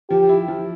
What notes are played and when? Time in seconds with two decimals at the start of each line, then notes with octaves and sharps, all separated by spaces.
0.10 F3 G4
0.29 E4
0.48 F3